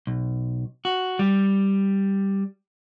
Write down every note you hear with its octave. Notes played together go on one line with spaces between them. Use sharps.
B1
F#4
G3